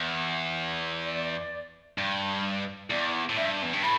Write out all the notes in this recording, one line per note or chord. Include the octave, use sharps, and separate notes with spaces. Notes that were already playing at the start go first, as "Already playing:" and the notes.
Already playing: E2
D5
G2
E2 D5
A2
G2 E5
E2
G2
A2 B5